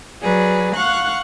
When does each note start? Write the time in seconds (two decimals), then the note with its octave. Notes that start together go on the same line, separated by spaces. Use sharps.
0.22 F#3 G#4 B4 D5
0.76 F5 F#5 C#6 F#6